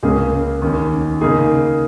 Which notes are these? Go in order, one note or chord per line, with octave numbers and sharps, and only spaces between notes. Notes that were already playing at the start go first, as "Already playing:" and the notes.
C#2 C#3 A#3 C#4 G#4
D#2 D#3 C#4
C#3 A#3 D#4 G#4